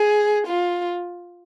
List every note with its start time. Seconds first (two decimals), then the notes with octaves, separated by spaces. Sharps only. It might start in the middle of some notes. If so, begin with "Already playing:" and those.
Already playing: G#4
0.47 F4